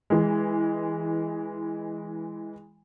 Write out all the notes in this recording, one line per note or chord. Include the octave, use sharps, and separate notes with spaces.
E3 G#3